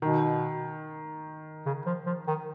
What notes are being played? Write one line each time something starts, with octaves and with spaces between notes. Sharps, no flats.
B2 D#3
C#3
F3
F3
D#3